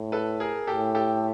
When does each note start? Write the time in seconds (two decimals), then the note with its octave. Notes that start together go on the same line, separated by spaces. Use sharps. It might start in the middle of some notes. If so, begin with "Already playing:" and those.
Already playing: A2
0.12 A4 B4
0.40 G#4 A#4
0.67 A2 G4 A4
0.95 G4 A4